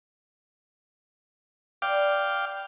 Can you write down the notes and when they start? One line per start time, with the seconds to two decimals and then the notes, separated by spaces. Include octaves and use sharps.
1.82 B4 D5 F5 G5 D6